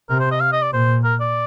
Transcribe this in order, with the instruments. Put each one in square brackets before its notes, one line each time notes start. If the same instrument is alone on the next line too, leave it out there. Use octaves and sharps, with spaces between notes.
[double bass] C3 [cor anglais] A#4
[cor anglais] C5
D#5
F5
D#5
D5
[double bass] A#2 [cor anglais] C5
[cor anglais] A#4
D5